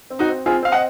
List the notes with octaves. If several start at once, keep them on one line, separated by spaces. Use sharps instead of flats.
C4
D#4 F#4
C4
C4 F4 G#4
C4 F5
D#5 F#5